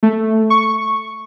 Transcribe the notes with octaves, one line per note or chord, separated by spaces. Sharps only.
A3
C#6